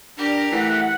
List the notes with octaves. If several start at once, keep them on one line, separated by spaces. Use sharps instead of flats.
D4 G4 A#4
E3 A3 F#5